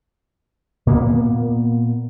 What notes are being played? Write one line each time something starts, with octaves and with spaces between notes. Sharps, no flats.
A#2 A#3 B3